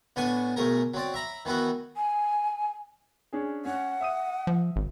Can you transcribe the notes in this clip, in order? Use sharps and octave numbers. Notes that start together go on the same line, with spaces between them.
A2 B3 D4 G#5 C#6
B1 A3 G#4 A#4
F#3 C4 D5
E5 A#5 B5
D#3 E3 B3 E4 F#4
G#5
C#4 D4 G#4
C#4 F#5
E5 D#6 D#7
F3
G#1